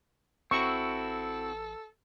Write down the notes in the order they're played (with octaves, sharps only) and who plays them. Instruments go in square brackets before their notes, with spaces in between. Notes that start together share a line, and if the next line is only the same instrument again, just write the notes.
[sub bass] A1 [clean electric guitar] C4 E4 F#4 [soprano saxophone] A4 [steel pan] C#6